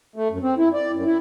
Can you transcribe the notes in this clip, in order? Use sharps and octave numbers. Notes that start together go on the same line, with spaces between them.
A3
F#2
C4
E4
D5
F#2
E4